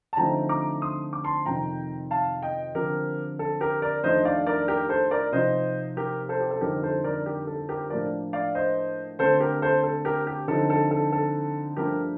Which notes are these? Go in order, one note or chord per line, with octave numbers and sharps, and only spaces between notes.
A5
D3 F3 A3 C4 D#4 G5 A#5
A#5 D6
C6 D#6
D6
A5 C6
F2 C3 D#3 G5 A#5
F5 A5
D#5 G5
D3 F3 C4 G4 A#4
A4
G4 A#4
A#4 D5
F2 D#3 A3 D4 C5 D#5
D5 F5
A#4 D5
G4 A#4
A4 C5
A#4 D5
C3 F3 C4 D#4 C5 D#5
G4 A#4
A4 C5
G4
A4
F2 D3 G3 C4 D#4 G4 A#4
A4 C5
A#4 D5
G4 A#4
A4
G4 A#4
A2 F3 A#3 D4 A#4 D5
D5 F5
C5 D#5
D3 A3 C4 A4 C5
G4 A#4
A4 C5
A4
G4 A#4
G4
D3 F3 C4 D#4 A4
A4
A4
A4
G2 F3 A3 D4 G4 A#4